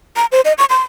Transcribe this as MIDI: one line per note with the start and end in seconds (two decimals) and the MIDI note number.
0.16 0.26 82
0.32 0.41 72
0.45 0.53 75
0.58 0.65 85
0.70 0.81 84